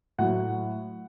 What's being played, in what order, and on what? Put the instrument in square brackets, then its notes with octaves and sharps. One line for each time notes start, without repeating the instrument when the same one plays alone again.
[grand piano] A2 F#3 F#5